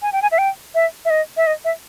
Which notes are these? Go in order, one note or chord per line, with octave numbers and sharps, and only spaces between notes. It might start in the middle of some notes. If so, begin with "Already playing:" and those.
G#5
G5
G#5
E5
G5
E5
E5
D#5
E5
D#5
E5